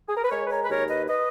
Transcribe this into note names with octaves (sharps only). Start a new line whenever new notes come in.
G#4
A#4
B4
G#3 A#4 C#5
B4
A#4 C#5
B4
D#2 A#4 C#5
B4 D#5
B4 D#5